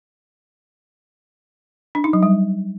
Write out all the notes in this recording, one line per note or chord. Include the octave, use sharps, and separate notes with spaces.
D4
D#4
F#3
G3